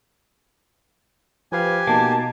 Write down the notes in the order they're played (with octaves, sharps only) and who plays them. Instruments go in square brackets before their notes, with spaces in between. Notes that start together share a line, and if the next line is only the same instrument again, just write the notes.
[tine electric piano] F3 B4 F5 [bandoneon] G4 G#5
[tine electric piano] B2 D#4 [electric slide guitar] A#3 [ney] A5